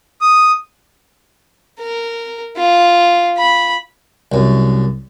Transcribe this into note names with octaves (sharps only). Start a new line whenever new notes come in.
D#6
A#4
F4
B5
C2 F#2